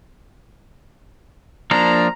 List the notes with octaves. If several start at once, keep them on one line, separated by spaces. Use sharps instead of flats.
F3 A#3 D4 A#5